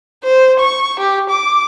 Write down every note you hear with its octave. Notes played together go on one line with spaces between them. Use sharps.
C5
C#6
G4
D6